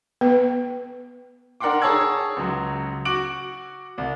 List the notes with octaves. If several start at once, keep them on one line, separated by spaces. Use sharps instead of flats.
B3 B4
D4 A#4 F#5 G5 C6 D6
G#4 C#5 A5 A#5 E6 G#6
C#2 F#3
F#4 C#6 D6 D7 F#7
C2